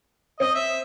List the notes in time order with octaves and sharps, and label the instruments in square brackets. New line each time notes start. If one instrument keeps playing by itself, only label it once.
[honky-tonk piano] C4 [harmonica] D#5
[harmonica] E5